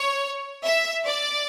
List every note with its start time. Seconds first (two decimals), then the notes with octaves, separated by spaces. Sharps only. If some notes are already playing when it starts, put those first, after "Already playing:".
Already playing: C#5
0.64 E5
1.05 D5